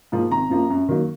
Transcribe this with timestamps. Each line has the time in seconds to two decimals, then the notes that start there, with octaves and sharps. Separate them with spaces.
0.12 G#2 F3 A#3
0.31 G#1 A#5
0.50 F#2 F3 A#3
0.70 F#2
0.88 D#3 F#3 A#3